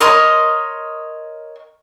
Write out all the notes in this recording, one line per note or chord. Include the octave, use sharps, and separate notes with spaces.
A#4 C#5 D#5 C6